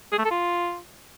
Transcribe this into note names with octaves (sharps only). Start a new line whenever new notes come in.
G#4
A3
A4
F4